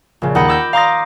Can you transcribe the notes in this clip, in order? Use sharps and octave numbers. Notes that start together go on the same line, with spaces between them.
A#1 C#3
D#2 D#4 F#5 B5 A#6
D6 E6 G6
F5 A#5 C6 D6 D#6 A#6